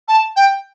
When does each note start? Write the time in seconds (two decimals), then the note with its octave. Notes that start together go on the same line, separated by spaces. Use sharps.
0.08 A5
0.36 G5